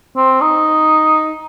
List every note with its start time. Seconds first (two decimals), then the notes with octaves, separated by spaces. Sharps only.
0.16 C4
0.41 D#4